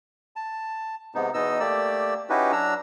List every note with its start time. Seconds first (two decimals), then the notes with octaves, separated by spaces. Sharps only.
0.36 A5
1.14 G#2 C3 B3 D#4
1.34 E2 B2 B3 D#4 D#5 E6
1.60 A3 A#3 G4 D5 E6
2.30 C#4 D#4 E4 F#4 G4 B4
2.52 F#3 D4 A#5 E6